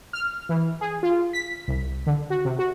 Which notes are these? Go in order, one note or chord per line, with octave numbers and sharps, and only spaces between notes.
F6
E3
G#4
F4
B6
C2
D3
F#4
C3
F#4